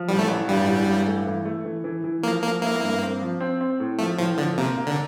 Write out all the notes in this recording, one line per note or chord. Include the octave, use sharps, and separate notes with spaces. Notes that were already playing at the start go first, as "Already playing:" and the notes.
Already playing: F3
A1 G3
A3
A1
G2 G3
A1
G2
A3
E3
A3
E3
E3
E3
F3 A#3
F3 A#3
A#3 E4
G2
C4
F3
C4
C4
A2
F3 A3
A2 F3
D3 F3
C3 A#3
A#3
D3